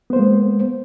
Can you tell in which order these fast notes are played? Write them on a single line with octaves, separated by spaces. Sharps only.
B3 C5 A#3 G#3